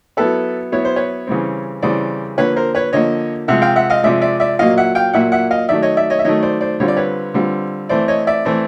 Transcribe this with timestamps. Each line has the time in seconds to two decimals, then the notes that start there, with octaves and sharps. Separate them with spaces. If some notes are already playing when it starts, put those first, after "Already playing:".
0.17 F#3 B3 E4 A4 B4
0.72 F#3 B3 E4 C#5
0.85 C5
0.96 B4 C#5
1.27 C#3 E3 G3 C4
1.82 C#3 E3 G3 C4 C5 D5
2.38 D3 F3 A#3 B4 C#5
2.56 A#4 C5
2.75 B4 C#5
2.93 D3 F3 A#3 C#5 D#5
3.48 C3 F3 G#3 E5 F#5
3.62 F5 G5
3.76 E5 F#5
3.90 D#5 F5
4.03 C3 F3 G#3 D5 E5
4.21 D5 E5
4.40 D5 E5
4.59 A#2 F#3 A#3 D#5 F5
4.78 E5 F#5
4.95 F5 G5
5.13 A#2 F#3 A#3 E5 F#5
5.32 E5 F#5
5.51 D#5 F5
5.69 D#3 F#3 A3 D5 E5
5.82 C#5 D#5
5.97 D5 E5
6.10 C#5 D#5
6.19 E5
6.25 D#3 F#3 A3 C#5 D#5
6.43 C5 D5
6.61 C5 D5
6.80 D3 G3 C4 F4 C#5
6.88 D5
6.97 B4 C#5
7.34 D3 G3 C4 F4
7.89 E3 A3 C4 E4 C5 D5
8.08 C#5 D#5
8.27 D5 E5
8.45 E3 A3 C4 E4